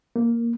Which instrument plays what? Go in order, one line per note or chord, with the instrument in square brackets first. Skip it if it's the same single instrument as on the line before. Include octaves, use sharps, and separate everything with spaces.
[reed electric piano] A#3